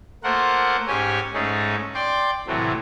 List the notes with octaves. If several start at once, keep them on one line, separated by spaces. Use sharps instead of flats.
A3 A#3 F4 A#4 C5 F#5
G#2 C#4 G4 C#5 G#5
G#2 A3 C#4 D#4 G#4
D5 G5 C6 D6
A2 C3 E3 F#3 A3